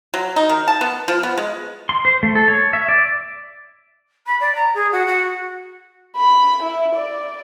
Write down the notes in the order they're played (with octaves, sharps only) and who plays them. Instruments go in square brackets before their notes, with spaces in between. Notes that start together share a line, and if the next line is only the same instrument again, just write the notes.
[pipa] F#3
D#4
D#3
A5
B3
F3
B3
G#3
[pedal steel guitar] C6
C5
A3
A4
C#5
E5
D5
[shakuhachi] B5
D5
A#5
G#4
F#4
F#4
[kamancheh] B5
E4
D5